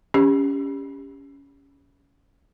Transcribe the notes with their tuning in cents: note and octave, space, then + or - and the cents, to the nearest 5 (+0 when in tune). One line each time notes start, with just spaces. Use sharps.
C#4 +15 G4 +25